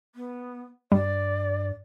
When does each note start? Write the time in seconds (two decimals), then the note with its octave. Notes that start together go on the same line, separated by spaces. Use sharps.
0.15 B3
0.92 G2 G3 D5